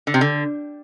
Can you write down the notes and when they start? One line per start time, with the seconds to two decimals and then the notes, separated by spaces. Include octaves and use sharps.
0.07 D3
0.14 C3
0.21 D3